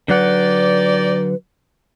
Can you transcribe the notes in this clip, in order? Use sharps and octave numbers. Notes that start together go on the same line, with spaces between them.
D3 F#3 D#4 G4 B4 D5 F#5